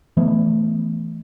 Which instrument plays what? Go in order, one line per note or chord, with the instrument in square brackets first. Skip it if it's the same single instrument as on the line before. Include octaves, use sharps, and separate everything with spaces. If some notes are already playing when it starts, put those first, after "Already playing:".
[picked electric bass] E3 A3 B3